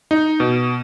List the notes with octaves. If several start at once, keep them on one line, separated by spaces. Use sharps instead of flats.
D#4
B2